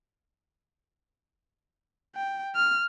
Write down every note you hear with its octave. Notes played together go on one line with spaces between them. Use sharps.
G5
F6